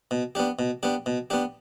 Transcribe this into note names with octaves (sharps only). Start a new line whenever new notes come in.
B2
B3 D4 G4
B2
B3 D4 G4
B2
B3 D4 G4